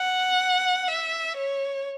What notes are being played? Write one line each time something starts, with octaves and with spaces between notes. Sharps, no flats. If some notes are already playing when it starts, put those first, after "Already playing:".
Already playing: F#5
E5
C#5